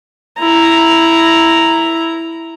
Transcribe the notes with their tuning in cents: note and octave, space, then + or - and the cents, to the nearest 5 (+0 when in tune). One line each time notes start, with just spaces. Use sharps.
E4 +0 A#5 +0